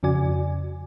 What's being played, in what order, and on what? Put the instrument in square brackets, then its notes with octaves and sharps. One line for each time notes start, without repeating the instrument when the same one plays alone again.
[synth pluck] F2 C#3 F#4 D5 G#5